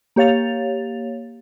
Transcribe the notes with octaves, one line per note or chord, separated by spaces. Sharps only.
A#3 G4 C#5 F5 A6 F7